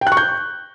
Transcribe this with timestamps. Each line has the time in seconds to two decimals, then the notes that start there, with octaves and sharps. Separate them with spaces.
0.01 G5
0.07 F#6
0.12 C#6
0.17 G6